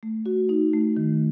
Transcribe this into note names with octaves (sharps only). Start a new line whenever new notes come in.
A3
F#4
D#4
A3
D#3